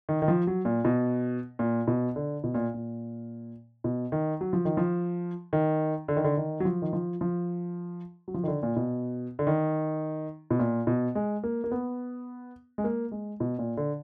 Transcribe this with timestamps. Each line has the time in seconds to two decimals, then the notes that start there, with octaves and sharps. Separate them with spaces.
0.09 D#3
0.22 D#3
0.28 F3
0.47 F#3
0.65 A#2
0.85 B2
1.59 A#2
1.88 B2
2.16 D3
2.44 B2
2.54 A#2
2.74 A#2
3.84 B2
4.12 D#3
4.41 F#3
4.53 F3
4.65 D#3
4.77 F3
5.53 D#3
6.08 D3
6.17 D#3
6.24 D3
6.37 D#3
6.60 F#3
6.65 F3
6.82 D#3
6.93 F3
7.21 F3
8.28 F#3
8.34 F3
8.43 D#3
8.48 D3
8.63 A#2
8.76 B2
9.39 D3
9.47 D#3
10.50 B2
10.59 A#2
10.87 B2
11.15 G#3
11.44 A#3
11.64 A#3
11.72 B3
12.78 G#3
12.84 A#3
13.12 G#3
13.40 B2
13.59 A#2
13.77 D3